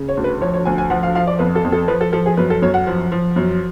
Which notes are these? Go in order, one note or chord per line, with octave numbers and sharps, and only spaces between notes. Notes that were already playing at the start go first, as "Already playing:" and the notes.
Already playing: C#3
C#5
D2
B4
F3 C#5
C#5
D2 G#5
G#5
F3 F#5
F5
F3 F5
D5
F2 B4
A4
F2
A4
F3 B4
A4
F3 A4
G#4
F#2 B4
A4
F#2 C#5
F#5
F3
F3
F#2